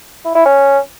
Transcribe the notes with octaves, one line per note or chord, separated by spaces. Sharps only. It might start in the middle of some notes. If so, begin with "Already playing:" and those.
E4
E4
C#4